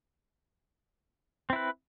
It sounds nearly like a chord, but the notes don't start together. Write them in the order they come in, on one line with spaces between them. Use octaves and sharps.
C4 E4 B4